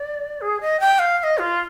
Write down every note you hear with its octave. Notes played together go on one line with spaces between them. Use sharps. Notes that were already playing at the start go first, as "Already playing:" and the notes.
Already playing: D5
G#4
D#5
G5
F5
F5
D#5
F4